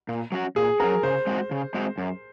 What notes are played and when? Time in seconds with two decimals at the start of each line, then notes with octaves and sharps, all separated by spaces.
0.09 A#2
0.32 F#3 C#4 F#4
0.56 A#2 G#4
0.80 F#3 C#4 F#4 A#4
1.03 C#3 C5
1.27 G#3 C4 F#4
1.51 C#3
1.74 G#3 C4 F#4
1.98 F#2